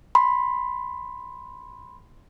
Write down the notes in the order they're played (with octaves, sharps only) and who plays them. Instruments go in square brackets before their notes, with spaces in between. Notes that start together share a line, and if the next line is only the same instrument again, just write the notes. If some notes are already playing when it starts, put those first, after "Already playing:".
[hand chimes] B5 C6